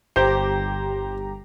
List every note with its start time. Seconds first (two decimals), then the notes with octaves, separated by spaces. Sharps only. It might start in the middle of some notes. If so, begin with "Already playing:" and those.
0.16 G1 G4 C5 A#5